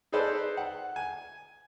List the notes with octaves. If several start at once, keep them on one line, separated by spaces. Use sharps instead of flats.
D#4 G#4 A4 B4 C5 D5
F#5
G#5